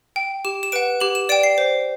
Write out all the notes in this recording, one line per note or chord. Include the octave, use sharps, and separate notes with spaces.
G5
G4 E7
E7
B4 F#5 D7
G4 F#7
E7
D5 G5 D7
C7
C5